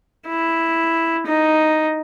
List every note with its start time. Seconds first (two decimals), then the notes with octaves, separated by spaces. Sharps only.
0.27 E4
1.26 D#4